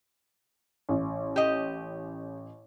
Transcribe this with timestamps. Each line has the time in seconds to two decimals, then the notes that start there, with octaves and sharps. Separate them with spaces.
0.89 A1
1.36 G4 D#5